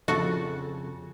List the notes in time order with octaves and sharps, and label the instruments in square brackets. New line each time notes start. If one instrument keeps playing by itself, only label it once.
[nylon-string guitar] F2 C#3 [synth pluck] F3 A4 A6 [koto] F#4